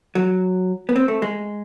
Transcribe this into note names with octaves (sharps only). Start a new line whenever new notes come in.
F#3
B3
C4
A3
G#3